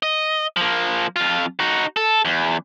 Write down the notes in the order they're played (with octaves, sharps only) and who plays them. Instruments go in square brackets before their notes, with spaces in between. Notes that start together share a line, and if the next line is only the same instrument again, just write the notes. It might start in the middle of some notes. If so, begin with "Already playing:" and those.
[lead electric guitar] D#5
F3 A#3
F2 F4
D#4 F#4
A4
E2